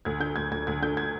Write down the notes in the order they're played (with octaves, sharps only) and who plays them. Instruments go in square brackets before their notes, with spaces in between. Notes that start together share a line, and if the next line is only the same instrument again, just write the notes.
[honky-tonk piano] D2 G#6
D3 G6
D2 G#6
D2 G#6
D2 G#6
D3 G6
G#6